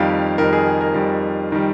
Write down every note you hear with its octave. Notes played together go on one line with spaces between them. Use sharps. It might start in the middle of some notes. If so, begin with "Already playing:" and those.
Already playing: F2 D#3 G3 F5
F2 D#3 G3 A#4
G#4
G#4
A#4
F2 D#3 G3
D#3 G3